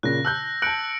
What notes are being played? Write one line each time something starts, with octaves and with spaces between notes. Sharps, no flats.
A#2 C#3 F#6 A#6
A5 E6 F#6 G6
A5 F#6 C#7 D7 F#7